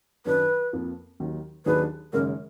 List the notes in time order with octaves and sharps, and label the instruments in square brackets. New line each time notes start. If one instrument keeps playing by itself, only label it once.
[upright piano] F#2 D#3 F#3 D4 [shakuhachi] B4
[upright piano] F2 F3 A#3
D#2 D#3 F#3
[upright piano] D#2 D#3 F#3 D4 G#4 [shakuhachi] B4
[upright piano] F#1 F#2 D#3 G#3 [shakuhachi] A#4